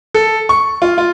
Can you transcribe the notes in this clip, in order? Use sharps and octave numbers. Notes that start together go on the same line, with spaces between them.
A4
C#6
F4
F4